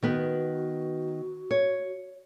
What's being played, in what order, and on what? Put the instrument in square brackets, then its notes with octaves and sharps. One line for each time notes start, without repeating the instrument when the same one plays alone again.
[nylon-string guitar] D#3 B3 B4 [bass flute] F#4
[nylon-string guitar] C#5